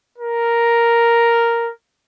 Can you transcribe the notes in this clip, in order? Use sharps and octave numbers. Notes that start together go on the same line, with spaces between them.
A#4